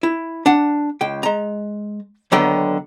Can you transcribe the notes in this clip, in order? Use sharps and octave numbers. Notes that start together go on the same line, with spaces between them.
E4
D4 F#5
C#2 G5
G#3 A#5
D#2 D3 F#3 B3 G5